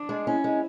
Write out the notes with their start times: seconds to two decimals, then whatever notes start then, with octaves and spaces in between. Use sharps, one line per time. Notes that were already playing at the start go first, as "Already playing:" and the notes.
Already playing: D4
0.09 G#3
0.27 C#4 E4
0.44 G#3